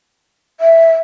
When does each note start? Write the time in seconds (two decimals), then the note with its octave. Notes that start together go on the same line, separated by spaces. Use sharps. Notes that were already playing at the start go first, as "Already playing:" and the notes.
0.60 E5